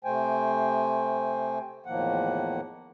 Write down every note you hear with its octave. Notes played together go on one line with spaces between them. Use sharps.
C3 A3 C5 G5 G#5
E2 A2 D#3 F3 A#3 F#5